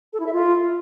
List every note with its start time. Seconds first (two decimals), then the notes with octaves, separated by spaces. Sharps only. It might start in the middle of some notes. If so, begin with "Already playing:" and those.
0.13 A4
0.20 E4
0.26 E5
0.33 F4